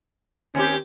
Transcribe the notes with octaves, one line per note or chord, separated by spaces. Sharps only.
D#2 C4 C#4 G4